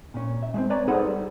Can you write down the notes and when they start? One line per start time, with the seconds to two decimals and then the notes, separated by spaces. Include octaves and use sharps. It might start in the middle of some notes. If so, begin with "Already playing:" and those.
0.14 A#2 C#4
0.43 E5
0.54 G#3 A3 C4
0.70 B4 C#5 D5 G#5 A#5
0.88 D#4 G#4 A4 B4 C5 F#5
1.07 G3